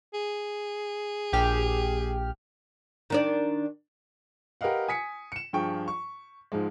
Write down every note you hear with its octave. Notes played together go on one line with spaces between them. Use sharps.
G#4
A#1 G4 F6
D#3 D4 D5
G4 A#4 B4 D#5 F5 F#5
G#5 D#6 B6 C#7
C#7 E7
G2 F3 G#4 G5 C#6
C#6
G#2 F3 G#3